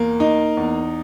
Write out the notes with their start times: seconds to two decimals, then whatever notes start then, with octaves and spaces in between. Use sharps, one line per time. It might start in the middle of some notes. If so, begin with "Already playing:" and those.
Already playing: E2 A#3
0.20 D#4
0.57 E2